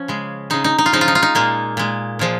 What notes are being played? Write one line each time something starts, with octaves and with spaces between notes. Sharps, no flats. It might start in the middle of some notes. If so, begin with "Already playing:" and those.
Already playing: F3 C#4
C#3 G#3
C#3 G#3 D#4
D#4
D#4
F4
C#3 F3 G#3 D#4
F4
D#4
F4
D#4
A#2 G#3 A#3
A#2 G#3
A#2 F3 G#3